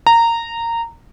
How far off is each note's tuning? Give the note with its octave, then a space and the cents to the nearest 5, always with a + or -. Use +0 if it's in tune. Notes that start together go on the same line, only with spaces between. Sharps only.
A#5 -15